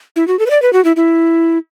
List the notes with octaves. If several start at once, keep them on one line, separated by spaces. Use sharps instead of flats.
E4
F#4
A4
B4
D5
B4
F#4
E4
E4